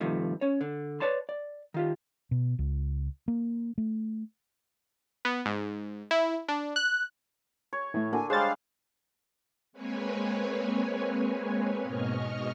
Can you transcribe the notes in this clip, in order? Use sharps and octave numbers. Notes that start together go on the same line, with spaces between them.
G2 C3 D#3 F3 A3
C#4 C#5
D3
B4 C#5 D5 A5 C6
D5
D#3 F4 G4
B2
C#2
A#3
A3
B3
G#2
E4
D4
F#6
C#5
A2 E3 A3
D3 A#3 F#4 G#5
G3 G#3 G#4 C5 C#5 F5 A6
G#3 A#3 C4 B4 C#5 G#5
G#2 B2 D#5 C#6 F6